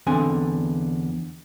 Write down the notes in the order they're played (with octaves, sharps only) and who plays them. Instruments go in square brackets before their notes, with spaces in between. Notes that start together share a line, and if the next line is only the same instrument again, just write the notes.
[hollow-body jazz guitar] E2 D3 C4 G#5